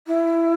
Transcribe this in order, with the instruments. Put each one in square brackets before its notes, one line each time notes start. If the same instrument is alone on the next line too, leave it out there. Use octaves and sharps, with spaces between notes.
[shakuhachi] E4